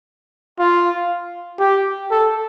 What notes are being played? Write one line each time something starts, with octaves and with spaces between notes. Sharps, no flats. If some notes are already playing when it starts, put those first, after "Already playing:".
F4
G4
A4